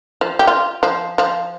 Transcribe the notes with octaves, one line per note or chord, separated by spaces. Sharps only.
F3
G4
F4
F3
F3